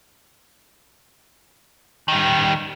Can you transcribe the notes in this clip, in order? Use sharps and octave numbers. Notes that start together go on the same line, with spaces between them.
D#3 G3